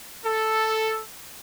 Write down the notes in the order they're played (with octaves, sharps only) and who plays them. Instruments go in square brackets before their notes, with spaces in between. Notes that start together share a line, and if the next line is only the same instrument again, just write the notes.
[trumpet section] A4